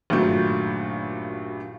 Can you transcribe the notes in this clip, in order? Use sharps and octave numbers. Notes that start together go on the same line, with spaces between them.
G#1 G2 A#2 F#3 A3 G6